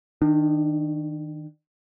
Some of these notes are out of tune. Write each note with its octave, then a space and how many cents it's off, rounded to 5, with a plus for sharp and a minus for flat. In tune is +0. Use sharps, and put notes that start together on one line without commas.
D#3 +10 D4 +40